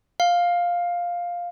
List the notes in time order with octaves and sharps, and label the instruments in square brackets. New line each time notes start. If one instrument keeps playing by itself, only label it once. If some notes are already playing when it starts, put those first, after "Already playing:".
[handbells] F5